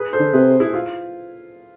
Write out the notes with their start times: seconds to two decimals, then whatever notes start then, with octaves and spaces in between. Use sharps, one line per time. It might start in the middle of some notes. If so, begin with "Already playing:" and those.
Already playing: G#4 B4
0.13 A4 C5
0.19 D3
0.33 C3 G#4 B4
0.60 E4 G#4
0.74 F4